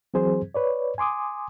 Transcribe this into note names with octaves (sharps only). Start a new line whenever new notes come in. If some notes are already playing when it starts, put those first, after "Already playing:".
E3 F#3 C4 G#4 C5
B4 C#5 D5
G#5 C6 D6 D#6